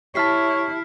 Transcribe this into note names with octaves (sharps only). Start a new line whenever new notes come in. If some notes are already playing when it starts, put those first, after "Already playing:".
E4 G4 C#5 E5 A5 F6 B6 C7